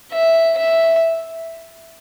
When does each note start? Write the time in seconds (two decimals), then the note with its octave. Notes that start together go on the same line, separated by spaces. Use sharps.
0.13 E5
0.58 E5